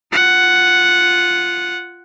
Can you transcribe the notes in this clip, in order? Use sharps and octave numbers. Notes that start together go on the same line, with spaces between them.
F4 F#5